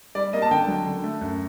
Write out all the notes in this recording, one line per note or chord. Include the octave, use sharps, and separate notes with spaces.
G3 D5
A#3 D#5
A5
D3 G5
F#3
D3
A3
F#2